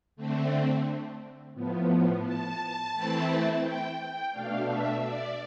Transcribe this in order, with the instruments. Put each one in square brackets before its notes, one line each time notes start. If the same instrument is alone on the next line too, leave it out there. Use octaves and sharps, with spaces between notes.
[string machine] D3 A3 C4
A2 F3 B3
A5
E3 A3 C4 E4
G5
G5
B2 A3 D4 F5
E5
D5